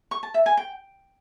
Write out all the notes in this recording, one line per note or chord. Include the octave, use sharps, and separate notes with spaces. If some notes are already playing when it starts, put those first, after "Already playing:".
C#6
A5
E5
G#5
G5